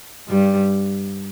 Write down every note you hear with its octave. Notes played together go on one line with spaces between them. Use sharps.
G2 G3